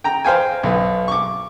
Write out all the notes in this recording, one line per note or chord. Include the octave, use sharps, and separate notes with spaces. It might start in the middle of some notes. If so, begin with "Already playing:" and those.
G5 A#5
C5 F5 G5 G#5
B1 B3
C#6 D6